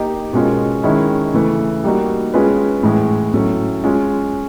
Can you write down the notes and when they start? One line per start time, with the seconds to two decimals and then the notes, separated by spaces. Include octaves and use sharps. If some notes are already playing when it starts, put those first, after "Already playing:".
Already playing: A#3 D#4 G4
0.33 B2 G#3 C#4 F4 A#4
0.83 D#3 G#3 C#4 E4
1.34 C#3 E3 A3
1.84 G3 A#3 D#4 F#4
2.34 G#3 C#4 F4 G#4 B4
2.83 A2 E3 G#3
3.34 A2 F#3 A3 C#4
3.84 G#3 C#4 F4